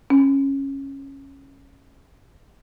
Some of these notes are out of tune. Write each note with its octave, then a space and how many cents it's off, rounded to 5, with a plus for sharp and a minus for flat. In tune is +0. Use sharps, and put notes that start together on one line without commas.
C#4 -15